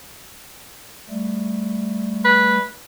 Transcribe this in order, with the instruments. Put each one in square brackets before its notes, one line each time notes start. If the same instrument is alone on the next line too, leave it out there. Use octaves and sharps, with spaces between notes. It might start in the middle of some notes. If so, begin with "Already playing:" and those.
[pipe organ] G3 A3
[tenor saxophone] B4